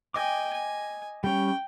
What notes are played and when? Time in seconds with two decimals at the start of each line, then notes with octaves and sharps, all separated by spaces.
0.14 D#5 G5 G#5 D6
0.53 G#5
1.24 G3 C#4 G5